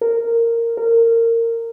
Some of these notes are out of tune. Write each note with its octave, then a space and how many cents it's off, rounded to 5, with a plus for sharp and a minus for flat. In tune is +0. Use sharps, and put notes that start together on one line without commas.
A#4 -10
A#4 -20